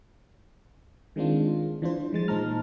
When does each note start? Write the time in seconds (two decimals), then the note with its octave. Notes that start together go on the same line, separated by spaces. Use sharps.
1.16 D#3 G#3 C4 D4 F4
1.82 E3 D4 F4 C5
2.13 F3 G#3 A6
2.28 A#2 D#4 C5 A5 A#5 F6